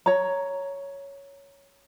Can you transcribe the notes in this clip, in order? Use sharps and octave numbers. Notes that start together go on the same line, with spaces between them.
C#5 A#5